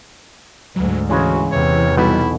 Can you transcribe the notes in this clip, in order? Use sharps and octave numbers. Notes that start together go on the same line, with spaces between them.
D2 G#2 F#3
C#3 E3 G#3 C#4 F#4
E2 C3 C#5
B1 B2 G3 B3 E4